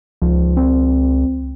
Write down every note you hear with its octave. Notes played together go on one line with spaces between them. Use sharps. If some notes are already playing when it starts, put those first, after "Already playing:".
C#2 F3
C4